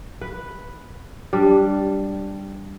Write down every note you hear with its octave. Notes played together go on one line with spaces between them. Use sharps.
B4
G3 D4